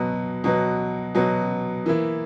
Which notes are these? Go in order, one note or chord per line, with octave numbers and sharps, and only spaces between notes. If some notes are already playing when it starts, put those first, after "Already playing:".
Already playing: B2 F#3 B3
B2 F#3 B3
B2 F#3 B3
E3 A#3 E4